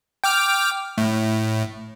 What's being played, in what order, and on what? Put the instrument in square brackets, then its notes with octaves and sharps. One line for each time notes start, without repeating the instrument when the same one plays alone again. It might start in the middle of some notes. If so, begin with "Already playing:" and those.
[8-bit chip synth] G5 D6 F6
A2